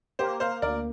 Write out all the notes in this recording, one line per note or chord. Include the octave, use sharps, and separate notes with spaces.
A#3 G4 C5
C5 F5
D2 A#4 D5